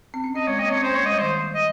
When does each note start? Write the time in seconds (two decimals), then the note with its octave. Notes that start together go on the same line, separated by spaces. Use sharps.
0.14 C4
0.24 C#4
0.35 C4 D#5
0.47 G#3 C#5
0.59 A#3 D#5
0.68 C4 C#5
0.76 C#4
0.83 A#3 C5
0.94 A#3 C#5
1.03 G#3
1.06 D#5
1.12 G3
1.18 D#3 C5
1.55 D#5